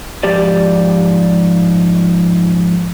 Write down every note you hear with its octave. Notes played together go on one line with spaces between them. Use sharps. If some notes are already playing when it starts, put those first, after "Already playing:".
G#2 F3 G4 D5